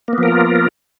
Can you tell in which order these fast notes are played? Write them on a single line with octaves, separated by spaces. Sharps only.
A#3 B3 F3 A#4 F4